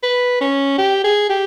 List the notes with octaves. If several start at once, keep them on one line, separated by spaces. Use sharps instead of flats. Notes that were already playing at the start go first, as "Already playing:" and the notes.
B4
C#4
G4
G#4
G4